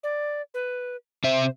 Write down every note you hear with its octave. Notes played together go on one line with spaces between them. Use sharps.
D5
B4
C3 C5 E5